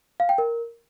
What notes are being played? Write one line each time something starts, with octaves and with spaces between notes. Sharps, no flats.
F5
G5
A#4